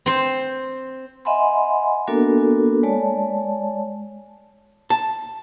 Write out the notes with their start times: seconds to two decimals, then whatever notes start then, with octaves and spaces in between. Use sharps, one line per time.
0.06 C4 C5
1.25 D#5 E5 F#5 G#5 B5 C6
2.07 A#3 B3 D4 F#4 A4 A#4
2.83 G#3 C#5 D5 A5
4.90 A5